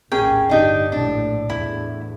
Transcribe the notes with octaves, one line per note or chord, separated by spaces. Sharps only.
A#1 D#2 A2 A#3 C#4 G#4 G5
G1 D4 D#4 G4
A#1 A2 D4
E2 A2 E4